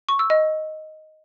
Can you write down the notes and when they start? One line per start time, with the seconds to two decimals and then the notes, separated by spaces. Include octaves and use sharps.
0.09 C#6
0.19 E6
0.30 D#5